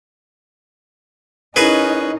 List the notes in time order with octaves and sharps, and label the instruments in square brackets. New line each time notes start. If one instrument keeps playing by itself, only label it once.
[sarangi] C#4 [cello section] D#4 [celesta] E4 A#4 [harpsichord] F#4 G#4 B4